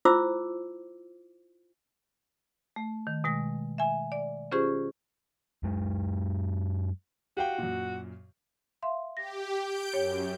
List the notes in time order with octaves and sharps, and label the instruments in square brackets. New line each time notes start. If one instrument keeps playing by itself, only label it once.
[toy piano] E4 F4 C5 D6 E6
[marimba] A3
D#3
B2 G#3 A#6
E5 G#5
D5
C#4 F4 G4 G#4 C5 C#6
[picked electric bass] F#2 G#3
[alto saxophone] F#4 [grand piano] G4 F5 G5
[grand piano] F#2 A#2
[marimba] E5 F5 C6
[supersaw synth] G4 [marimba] A#6
[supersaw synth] G6 D7
[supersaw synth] F#2 [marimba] G4 C#5